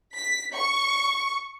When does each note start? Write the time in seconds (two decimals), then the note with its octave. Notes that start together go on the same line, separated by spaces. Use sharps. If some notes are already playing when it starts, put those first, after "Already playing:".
0.18 B6
0.56 C#6